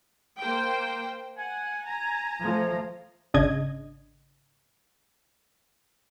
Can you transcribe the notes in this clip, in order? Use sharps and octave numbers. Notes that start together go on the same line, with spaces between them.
A#3 C5 G5
F#5 G#5
A#5
F3 A3
G#1 C#3 D4 D#5 G#6